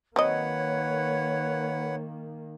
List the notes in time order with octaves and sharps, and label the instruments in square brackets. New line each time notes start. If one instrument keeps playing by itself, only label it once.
[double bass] D#3 A#3 [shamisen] F#3 C4 D#5 [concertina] B4 F#5 [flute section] C#5